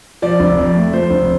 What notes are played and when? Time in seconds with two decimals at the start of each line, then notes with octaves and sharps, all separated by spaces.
0.22 F3 D5
0.40 F1
0.58 F2
0.76 A3
0.93 F3 C5
1.11 F1